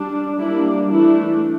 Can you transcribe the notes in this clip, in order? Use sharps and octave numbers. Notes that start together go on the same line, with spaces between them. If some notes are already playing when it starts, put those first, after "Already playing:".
Already playing: G3 D4
G3 A#3 D4 E4
E3 A3 D4 E4